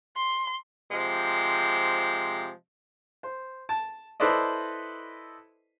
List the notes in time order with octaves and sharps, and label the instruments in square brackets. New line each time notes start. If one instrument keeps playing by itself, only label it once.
[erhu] C6
[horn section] C3 F3 G#3
[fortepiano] C5
A5
E4 A4 B4 C5 D5 D#5